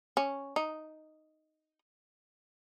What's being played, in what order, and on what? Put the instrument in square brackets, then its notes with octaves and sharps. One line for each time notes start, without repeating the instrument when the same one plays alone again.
[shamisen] C#4
D#4